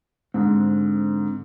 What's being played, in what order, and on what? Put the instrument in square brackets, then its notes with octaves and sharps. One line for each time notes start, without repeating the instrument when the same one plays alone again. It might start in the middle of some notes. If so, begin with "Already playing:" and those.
[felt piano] G#2 [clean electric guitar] D3 C4